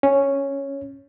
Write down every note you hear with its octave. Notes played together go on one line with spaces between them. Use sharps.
C#4